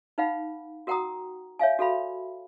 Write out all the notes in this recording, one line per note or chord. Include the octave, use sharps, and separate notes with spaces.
D#4 B4 F5 F#5 B5
F#4 A#4 F#5 G5 A#5 D#6
C#5 E5 F5 G#5
F#4 A4 F5 B5